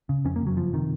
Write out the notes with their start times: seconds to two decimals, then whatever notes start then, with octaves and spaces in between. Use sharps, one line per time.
0.09 C#3
0.25 F2 C#4
0.36 A#3
0.41 F#1
0.47 F#3
0.57 F#1 F3
0.73 C3 D#3